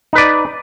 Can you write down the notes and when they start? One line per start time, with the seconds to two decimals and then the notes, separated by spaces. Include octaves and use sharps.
0.13 D#4
0.15 B4
0.18 D5